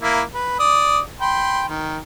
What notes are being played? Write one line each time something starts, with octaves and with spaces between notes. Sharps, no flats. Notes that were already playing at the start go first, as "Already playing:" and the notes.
A#3 E4
B4
D5 D#6
G5 B5 C6
D#3